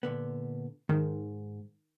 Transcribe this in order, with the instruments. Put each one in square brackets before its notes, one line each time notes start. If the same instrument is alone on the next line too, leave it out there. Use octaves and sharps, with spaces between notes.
[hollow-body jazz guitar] A#2 D3 B3
[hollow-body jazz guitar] G#2 [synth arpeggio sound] D#3